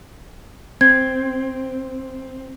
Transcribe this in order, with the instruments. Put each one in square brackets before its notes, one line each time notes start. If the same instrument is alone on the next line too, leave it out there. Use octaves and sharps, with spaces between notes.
[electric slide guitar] C4 [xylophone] G#6